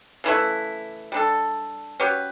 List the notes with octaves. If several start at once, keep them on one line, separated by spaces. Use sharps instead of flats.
C#3 E3 A3 E4
G3 D4 A4
F#3 C#4 G4 B4